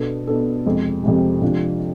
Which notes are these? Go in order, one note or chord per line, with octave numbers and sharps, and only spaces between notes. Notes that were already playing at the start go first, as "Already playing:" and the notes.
Already playing: B2 B3 D4 A4
B2 B3 D4 A4
F2 C3 G#3
F2 C3 G#3
F2 C3 G#3 D4 F4